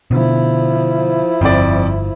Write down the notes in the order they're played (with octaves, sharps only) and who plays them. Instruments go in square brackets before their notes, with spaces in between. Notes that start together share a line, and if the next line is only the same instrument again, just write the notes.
[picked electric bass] B2 D3 [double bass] F3 E4
[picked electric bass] G1 [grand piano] F2 D5